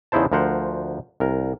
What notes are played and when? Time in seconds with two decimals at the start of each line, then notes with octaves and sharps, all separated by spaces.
0.12 E2 C#3 D#4 E4 C5 A5
0.32 D2 F3 A#4 C5 F#5
1.20 C2 A#4